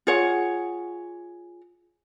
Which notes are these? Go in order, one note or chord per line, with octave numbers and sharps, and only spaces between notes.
F4 G#4 C#5 F#5